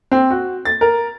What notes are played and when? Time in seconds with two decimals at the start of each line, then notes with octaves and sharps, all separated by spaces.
0.12 C4
0.31 F#4
0.65 A6
0.81 A#4